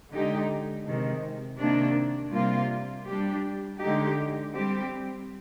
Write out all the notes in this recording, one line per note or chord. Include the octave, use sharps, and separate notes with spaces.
D3 G#3 D#4 G4
C3 D#3 G#3
C3 D#3 A#3 D4
C3 G3 A#3 F4
G3 D4 G4
D3 G#3 D#4 G4
G3 C4 G4